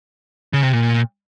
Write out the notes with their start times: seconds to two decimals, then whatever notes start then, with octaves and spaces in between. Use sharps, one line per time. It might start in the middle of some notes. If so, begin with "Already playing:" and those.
0.53 C#3
0.63 C3
0.73 A#2